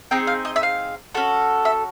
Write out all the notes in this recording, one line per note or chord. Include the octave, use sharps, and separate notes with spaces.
C4 D#4 G#4 G5
F5
D#5
E5
F5
C#4 F#4 A4
E5